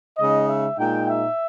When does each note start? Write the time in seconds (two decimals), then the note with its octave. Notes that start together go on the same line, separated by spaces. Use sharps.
0.18 C#3 G#3 D#4 D#5
0.49 E5
0.78 A#2 G#3 D#4 G5
1.08 E5